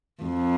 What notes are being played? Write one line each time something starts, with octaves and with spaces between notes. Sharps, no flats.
F2